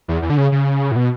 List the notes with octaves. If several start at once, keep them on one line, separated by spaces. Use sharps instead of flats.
E2
E2
D3
C#3
C#3
A2
B2